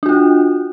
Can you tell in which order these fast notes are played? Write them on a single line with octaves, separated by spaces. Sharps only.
D4 F#4 F4